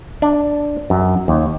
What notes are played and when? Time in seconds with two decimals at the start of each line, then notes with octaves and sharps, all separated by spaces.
0.22 D4
0.90 F#2
1.28 D#2